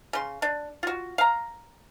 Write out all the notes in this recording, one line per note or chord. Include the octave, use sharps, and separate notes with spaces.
C#3 C6
D4
F4 F#4
F5 A#5